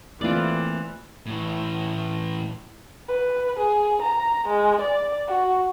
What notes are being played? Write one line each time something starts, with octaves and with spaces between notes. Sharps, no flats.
E3 A3 A#3 C4 F4 D5
A2 E3
B4
G#4
A#5
G#3
D5
F#4